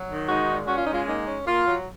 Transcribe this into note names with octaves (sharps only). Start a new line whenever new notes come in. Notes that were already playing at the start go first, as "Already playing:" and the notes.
Already playing: F#3
D#3
G#3 D#4 F#4
A#2
C#4 F#4
F4
G#3 D#4
F4
A#3 D#4
C#4
A#3 F4
F#3